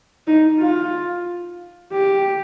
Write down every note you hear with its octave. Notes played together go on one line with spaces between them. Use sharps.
D#4
F4
G4